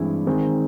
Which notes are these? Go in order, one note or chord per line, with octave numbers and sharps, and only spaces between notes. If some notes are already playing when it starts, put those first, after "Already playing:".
Already playing: G2 E3 G#3 C4 E4
D#3 G#3 C4 D#4